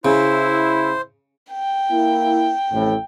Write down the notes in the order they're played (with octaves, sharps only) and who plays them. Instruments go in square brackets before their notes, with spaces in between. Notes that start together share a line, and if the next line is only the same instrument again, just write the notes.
[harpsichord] C#3 [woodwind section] E4 [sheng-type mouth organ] C5
[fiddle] G5
[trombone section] A#3 E4
A1 F2 A2